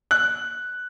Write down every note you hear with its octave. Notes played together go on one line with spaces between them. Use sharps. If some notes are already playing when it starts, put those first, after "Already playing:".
F#6